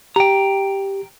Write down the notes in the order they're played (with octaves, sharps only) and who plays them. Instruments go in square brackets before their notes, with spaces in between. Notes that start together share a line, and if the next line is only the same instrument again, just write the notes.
[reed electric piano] G4 [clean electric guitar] G5 A#5